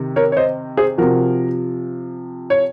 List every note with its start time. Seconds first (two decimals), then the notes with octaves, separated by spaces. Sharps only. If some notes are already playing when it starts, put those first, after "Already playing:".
Already playing: C3 D#3
0.16 A#4 C#5
0.32 C#5
0.37 C5 D#5
0.77 G#4 C5
0.98 C3 F3 F#4 A#4
2.50 C#5